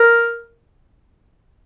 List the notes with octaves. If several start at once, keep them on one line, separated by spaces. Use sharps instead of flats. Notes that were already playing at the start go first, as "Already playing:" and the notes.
Already playing: A#4